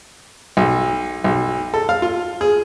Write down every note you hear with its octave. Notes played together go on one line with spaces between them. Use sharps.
B1
B1
A4
F5
F4
G#4